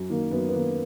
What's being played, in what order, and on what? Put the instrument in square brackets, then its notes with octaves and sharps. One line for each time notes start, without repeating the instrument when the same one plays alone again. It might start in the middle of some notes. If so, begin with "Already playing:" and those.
Already playing: [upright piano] F#2
D#3 A#3
F#2 B3
B3
D#3 A#3